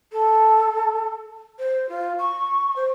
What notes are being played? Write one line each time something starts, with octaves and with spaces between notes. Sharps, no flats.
A4
C5
F4
C#6
C5